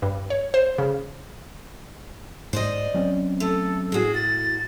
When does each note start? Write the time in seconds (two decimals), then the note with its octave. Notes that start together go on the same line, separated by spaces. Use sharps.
0.02 G2
0.30 C#5
0.54 C5
0.78 C#3
2.53 G#2 C5 D5 D#5
2.94 F#3 C4 C#4
3.40 A3 A4
3.92 A2 F#4 G#4
4.15 A6